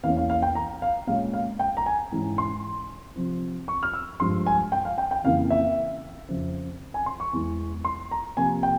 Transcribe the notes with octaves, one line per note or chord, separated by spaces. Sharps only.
E2 E3 A#3 C#4 F5
F5
F5
G5
A#5
F5
A#2 G#3 C#4 F5
F5
G5
A#5
G#5
G#2 E3 G#3 C#4
C6
C3 F3 C4
C#6
F6
E6
G2 F3 G#3 C6
G#5
G5
F5
G5
G5
F2 C#3 E3 A#3 F5
E5
F2 C#3 F3 C4
G#5
C6
C#6
E2 E3 G#3
C6
A#5
C3 F3 A#3 G#5
G5